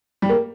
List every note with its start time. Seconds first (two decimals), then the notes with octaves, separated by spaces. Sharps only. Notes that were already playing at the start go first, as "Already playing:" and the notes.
0.22 G3
0.29 A#3